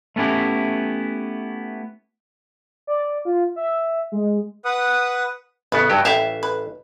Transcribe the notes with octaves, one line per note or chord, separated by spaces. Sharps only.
A3 B3 C#4 E4 G4
D5
F4
E5
G#3
B4 F#5 D#6
A1 C#3 B3 B4
G2 F#3 G4
A1 E3 G3 G4 E5 F5
B4